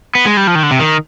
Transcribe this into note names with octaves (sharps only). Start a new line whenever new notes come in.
B3
G#3
G3
F3
D#3
D3
C3
D#3